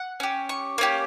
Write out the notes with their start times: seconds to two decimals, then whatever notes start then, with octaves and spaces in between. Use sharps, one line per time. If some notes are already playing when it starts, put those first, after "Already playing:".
Already playing: F#5
0.20 C#4 G4
0.49 C#6
0.78 A#3 C#4 G4